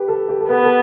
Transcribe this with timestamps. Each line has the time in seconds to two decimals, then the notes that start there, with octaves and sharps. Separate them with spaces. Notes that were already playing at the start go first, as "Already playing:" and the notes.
Already playing: G4 B4
0.08 A4
0.29 G4
0.41 A4
0.49 B3 B4
0.64 A4